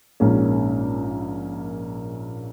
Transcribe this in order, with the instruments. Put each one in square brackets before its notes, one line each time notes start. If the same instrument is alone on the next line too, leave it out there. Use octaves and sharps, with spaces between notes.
[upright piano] A#1 G#2 A#3 C#4